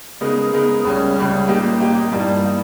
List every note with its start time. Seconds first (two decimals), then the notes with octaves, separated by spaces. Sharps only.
0.21 C#3 G#3 B3 D#4 A#4
0.52 C#3 G#3 B3 D#4 A#4
0.84 C#2 C#3 G3 C#4
1.17 C#2 C#3 G3 C#4
1.48 A#2 A#3 D#4 G4
1.80 A#2 A#3 D#4 G4
2.11 G2 E3 G3 A#3 D#4
2.44 E3 G3 A#3 D#4